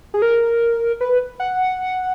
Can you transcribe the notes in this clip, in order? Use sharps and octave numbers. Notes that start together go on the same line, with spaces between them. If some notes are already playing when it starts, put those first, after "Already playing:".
G#4
A#4
B4
F#5